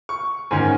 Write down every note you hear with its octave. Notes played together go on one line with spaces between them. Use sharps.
C#6
G#2 D#3 C#4 G#5